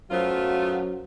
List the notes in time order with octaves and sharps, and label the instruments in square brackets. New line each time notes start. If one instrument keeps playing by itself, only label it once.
[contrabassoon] F#2 [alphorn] F#3 [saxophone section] A3 B3 F4 [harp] A#4 C5